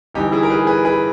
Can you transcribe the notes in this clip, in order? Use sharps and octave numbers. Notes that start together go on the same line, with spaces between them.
G1 G2 E3 D#4 G4
E4 G#4
A#4
G#4 B4
G#4 B4
G#4 B4